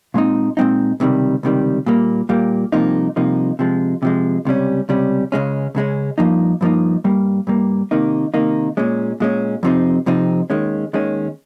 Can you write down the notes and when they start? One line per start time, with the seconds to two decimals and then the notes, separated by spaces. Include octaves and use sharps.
0.14 A#2 G#3 C4 D#4
0.57 A#2 G#3 C4 D#4
1.00 C#2 C3 D#3 G3
1.43 C#2 C3 D#3 G3
1.86 A#2 G3 A#3
2.29 A#2 G3 A#3
2.72 C2 C3 F3 A#3 D#4
3.16 C2 C3 F3 A#3 D#4
3.59 C3 F3 G#3
4.03 C3 F3 G#3
4.45 C#2 C3 G3 C#4
4.89 C#2 C3 G3 C#4
5.32 C#2 C#3 G#3 C#4
5.75 C#2 C#3 G#3 C#4
6.18 G2 F3 A#3 D#4
6.61 G2 F3 A#3 D#4
7.04 G2 G3 A#3
7.47 G2 G3 A#3
7.91 C3 D#3 A#3 D#4
8.34 C3 D#3 A#3 D#4
8.77 A#2 G#3 C#4
9.20 A#2 G#3 C#4
9.63 F2 C3 F3 C4 D#4
10.06 F2 C3 F3 C4 D#4
10.50 D#2 D#3 G#3 C#4
10.93 D#2 D#3 G#3 C#4